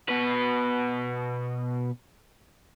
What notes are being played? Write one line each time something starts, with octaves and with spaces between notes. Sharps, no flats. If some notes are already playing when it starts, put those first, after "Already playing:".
B2 B4